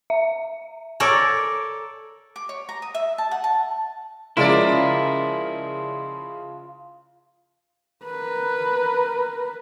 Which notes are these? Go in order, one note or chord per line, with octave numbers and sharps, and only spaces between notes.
E5
A4 A#4 C#5 D5
D6
C#5
A#5
D#6
E5
A5
F#5
A5
C#3 F3 G#3 E4 F4 A#4 D5
A#4 B4